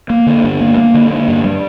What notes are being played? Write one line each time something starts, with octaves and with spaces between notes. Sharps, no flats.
A#3
D3
G2
A#3
A#3
D3
A#3
G2
G3